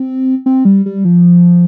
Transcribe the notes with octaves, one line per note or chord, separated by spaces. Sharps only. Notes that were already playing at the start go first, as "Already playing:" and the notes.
Already playing: C4
C4
G3
G3
F3